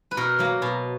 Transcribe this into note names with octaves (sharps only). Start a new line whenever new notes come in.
B4
B2 A#4
F#3 A#3
B2